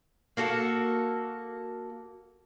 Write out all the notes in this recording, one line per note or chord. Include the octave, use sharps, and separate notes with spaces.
A#3 F#4 A4